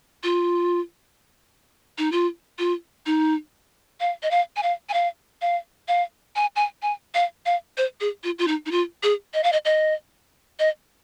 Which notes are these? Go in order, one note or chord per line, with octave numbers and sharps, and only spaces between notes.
F4
D#4
F4
F4
D#4
F5
D#5
F5
G#5
F5
G#5
F5
F5
F5
G#5
G#5
G#5
F5
F5
C5
G#4
F4
F4
D#4
D#4
F4
G#4
D#5
F5
D#5
D#5
D#5